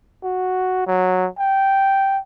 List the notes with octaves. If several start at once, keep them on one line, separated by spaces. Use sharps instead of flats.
F#4
F#3
G5